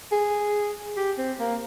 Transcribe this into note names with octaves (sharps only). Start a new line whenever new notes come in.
G#4
G4
C4
A#3